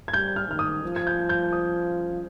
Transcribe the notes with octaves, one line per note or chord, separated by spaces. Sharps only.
G#6
G3 G6
F6
D#3 F6
D#6
F3
G#6
G6
G6
D#6